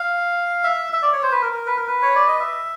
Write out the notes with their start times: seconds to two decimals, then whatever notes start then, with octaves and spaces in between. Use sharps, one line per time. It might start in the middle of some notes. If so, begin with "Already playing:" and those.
Already playing: F5
0.64 E5
0.93 E5
1.02 D5
1.13 C#5
1.23 C5
1.32 B4
1.42 A#4
1.52 A#4
1.66 B4
1.77 A#4
1.87 B4
2.02 C#5
2.15 D5
2.27 D#5
2.40 E5